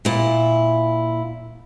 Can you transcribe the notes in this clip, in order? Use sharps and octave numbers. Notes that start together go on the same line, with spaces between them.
A#2 E4